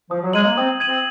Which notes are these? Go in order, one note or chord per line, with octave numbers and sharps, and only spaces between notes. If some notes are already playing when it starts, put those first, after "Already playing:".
F3 D#6
F#3
G#3 G#6 D#7 F#7
A#3
C4 D#6
G#6 D#7 F#7
C4